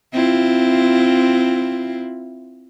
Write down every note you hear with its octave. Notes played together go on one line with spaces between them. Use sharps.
C4 E4 F4